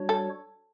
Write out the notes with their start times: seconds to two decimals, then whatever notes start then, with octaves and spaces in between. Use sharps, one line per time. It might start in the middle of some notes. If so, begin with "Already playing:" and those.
Already playing: G3 D4 F#4 C#5
0.09 A4